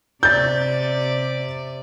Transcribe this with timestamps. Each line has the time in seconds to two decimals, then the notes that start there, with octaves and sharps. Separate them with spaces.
0.23 C3 D5 G6 A6